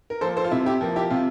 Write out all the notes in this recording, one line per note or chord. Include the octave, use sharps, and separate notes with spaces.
A#4
F3 A#3 A4 C5
A4 C5
F4
C3 E4
E4 G4
F3 A#3
E4 G4
C3 F4